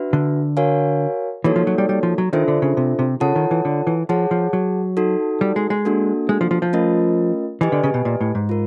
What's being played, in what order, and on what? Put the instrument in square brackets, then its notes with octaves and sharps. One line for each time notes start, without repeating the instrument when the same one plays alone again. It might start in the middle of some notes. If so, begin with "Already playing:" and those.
Already playing: [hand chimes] D4 F#4 B4 E5
[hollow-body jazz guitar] D3
[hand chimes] F#4 A#4 C#5 F5 G#5
[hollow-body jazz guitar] E3 [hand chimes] A#3 D#4 F#4 A4 C#5
[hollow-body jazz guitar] F3
F#3
G3
G3
F3
F#3
[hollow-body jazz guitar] D#3 [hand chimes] D4 F4 A4 C5 E5
[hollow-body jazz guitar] D3
C#3
C3
C3
[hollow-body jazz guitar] C#3 [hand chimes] F4 A4 C#5 F#5 A5
[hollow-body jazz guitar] D#3
E3
D3
E3
[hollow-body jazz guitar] F3 [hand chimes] G#4 C#5 F#5 A5
[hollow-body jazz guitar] F3
F#3
[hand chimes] D#4 F#4 A4
[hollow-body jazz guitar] G3
G#3
G#3
[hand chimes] A#3 D4 F#4 A4
[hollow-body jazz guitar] G#3
F3
F3
F3
[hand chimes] A3 C#4 F4 A#4 D#5
[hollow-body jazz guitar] E3 [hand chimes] G4 B4 D#5 G#5
[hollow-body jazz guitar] D3
C#3
B2
A#2
A2
G#2
[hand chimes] F4 A#4